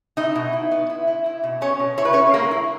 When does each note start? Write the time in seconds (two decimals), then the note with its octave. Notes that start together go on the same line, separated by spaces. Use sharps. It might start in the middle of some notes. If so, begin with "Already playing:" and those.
0.17 D#4 E4 D#5
0.35 B2
0.53 E4
0.71 B3
0.90 E4
1.07 E4
1.26 E4
1.43 B2
1.61 B3 C#4 C#5
1.79 B2
1.98 E4 C#5
2.05 B4
2.13 C#4 E4 C#5
2.33 G#3 A#3 A#4
2.51 E4